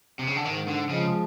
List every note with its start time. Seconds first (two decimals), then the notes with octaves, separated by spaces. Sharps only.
0.19 C3
0.27 C#3
0.36 D3
0.45 G#2 D#3
0.68 D3
0.89 C#3 F3 G#3